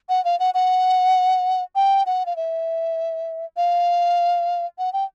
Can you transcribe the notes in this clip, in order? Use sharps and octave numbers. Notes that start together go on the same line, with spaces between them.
F#5
F5
F#5
F#5
G5
F#5
F5
E5
F5
F#5
G5